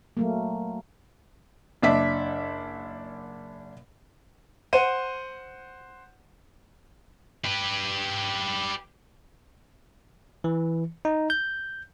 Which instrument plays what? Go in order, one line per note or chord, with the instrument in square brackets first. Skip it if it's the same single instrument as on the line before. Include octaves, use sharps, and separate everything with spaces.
[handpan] F#3 A3 A#3
[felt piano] F#1 D4 E5 B6
[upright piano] C5 F#5 D#7
[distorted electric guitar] G4 B4
[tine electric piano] E3
D#4
G6